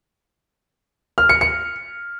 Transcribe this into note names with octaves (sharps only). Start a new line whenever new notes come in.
F6
C#7
C#7